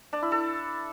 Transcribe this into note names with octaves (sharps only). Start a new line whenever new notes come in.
D4
E4
A4